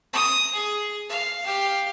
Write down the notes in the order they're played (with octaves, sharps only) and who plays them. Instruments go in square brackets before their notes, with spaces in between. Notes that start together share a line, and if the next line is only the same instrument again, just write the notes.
[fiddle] D#6
G#4
F5
G4 F5